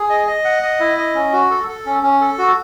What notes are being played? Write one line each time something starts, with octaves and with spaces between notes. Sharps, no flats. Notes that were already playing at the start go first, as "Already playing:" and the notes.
Already playing: G#4
D#5
D#5
F#5
D#5
E4
D#5
C#4
F#4
A4
A4
C#4
C#4
A4
F#4